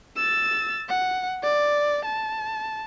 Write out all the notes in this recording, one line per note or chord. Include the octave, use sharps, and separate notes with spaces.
E6 A6
F#5
D5
A5